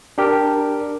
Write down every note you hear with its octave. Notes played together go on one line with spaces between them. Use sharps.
D4 G4 A#4